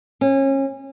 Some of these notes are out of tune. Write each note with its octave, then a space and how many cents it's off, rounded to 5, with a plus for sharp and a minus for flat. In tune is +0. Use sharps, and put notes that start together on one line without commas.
C#4 -30